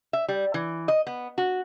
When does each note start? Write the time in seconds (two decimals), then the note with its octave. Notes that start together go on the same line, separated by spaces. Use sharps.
0.13 E5
0.28 G3
0.54 E3
0.88 D#5
1.07 B3
1.38 F#4